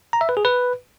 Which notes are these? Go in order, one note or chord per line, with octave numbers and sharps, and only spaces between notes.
A#5
E5
B4
G#4
B4